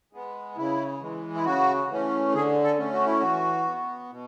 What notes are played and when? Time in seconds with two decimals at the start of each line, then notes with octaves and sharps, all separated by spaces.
0.13 G#3 B3
0.57 C#3 E4
1.02 E3 G#3
1.35 E4
1.45 C#3 F#4
1.90 E3 A3 C#4
2.34 D3 G#4
2.63 A4
2.79 A3 C#4
2.93 F#4
3.06 E4
3.19 E3 F#4
3.67 B3
4.11 B2